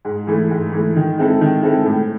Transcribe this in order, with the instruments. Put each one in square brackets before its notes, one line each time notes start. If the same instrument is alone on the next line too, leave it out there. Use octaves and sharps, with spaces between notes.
[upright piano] G#2
E3 A3
G#2
E3 A3
D#3
G#3 C4 E4 A4
D#3
G#3 C4 E4 A4
A2